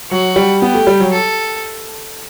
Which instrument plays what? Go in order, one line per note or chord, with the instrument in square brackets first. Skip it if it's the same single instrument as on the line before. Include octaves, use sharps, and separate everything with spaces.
[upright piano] F#3 [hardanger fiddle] F#4
[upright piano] G3
[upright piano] B3 [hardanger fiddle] G4
[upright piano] A3
G3
F#3
[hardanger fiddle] A4